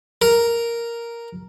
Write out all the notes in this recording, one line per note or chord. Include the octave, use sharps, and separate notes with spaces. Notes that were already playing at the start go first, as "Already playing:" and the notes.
A#4